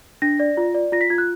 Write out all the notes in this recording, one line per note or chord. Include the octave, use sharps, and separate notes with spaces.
D4 A#6
D5
F4
D5
F4 A#6
B6
F4 G#6
F#6